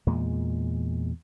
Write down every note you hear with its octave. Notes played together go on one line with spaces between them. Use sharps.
E2 A#2 G#3